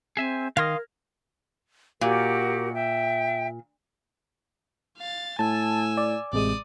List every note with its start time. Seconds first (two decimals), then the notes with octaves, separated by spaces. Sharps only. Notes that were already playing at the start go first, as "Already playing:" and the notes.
0.17 C4 G#4 E5 G#5
0.57 D#3 A#4 F5 C6 D#6 F6 G#6 A#6
2.01 A#2 F#4 G4 A#4
2.74 E5 G5
4.98 F5 A6
5.39 A2 G#5 A5 E6
5.97 D5
6.33 A1 C3 G#3 D5 D#6